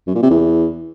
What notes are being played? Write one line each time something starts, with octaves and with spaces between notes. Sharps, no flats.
F#2
A#2
C3
E2